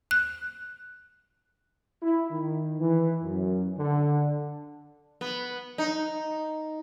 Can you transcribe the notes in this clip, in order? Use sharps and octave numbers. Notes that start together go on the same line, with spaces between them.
F#6
E4
D#3
E3
F#2
D3
B3
D#4